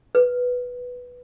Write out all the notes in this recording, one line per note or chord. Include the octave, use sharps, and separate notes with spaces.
B4